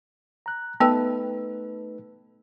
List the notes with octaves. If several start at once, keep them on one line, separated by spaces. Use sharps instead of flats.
A#5 F#6
A3 B3 D#4 B4 G5 E6